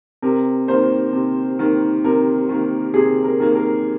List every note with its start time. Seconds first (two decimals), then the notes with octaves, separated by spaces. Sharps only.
0.22 C3 A#4
0.68 D#3 A#3 C5
1.13 C3
1.59 D#3 A#3
2.04 C3 A#4
2.49 D#3 A#3
2.94 C3 G#4
3.24 A#4
3.40 D#3 A#3
3.55 A#4